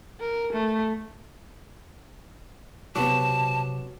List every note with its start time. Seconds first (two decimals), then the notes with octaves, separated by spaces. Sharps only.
0.20 A#4
0.53 A3
2.96 C3 F#3 B3 A5 D6